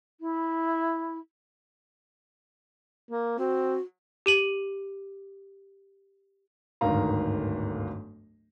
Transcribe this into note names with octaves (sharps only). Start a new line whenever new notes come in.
E4
A#3
C4 F#4
G4 D#7 F#7
D1 G1 G#2 D#3 F5 A#5